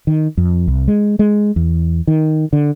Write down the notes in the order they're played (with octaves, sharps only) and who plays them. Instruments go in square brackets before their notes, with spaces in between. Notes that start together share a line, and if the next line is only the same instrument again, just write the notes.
[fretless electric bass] D#3
F2
C2
G#3
G#3
E2
D#3
D3